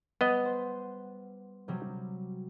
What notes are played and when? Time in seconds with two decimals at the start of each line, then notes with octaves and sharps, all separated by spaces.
0.21 G3 B3 D#5 F#5
0.45 C5
1.68 C3 F#3 G3